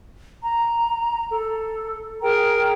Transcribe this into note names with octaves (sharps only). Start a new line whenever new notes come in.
A#5
A4
G#4 A#4 G5 A#5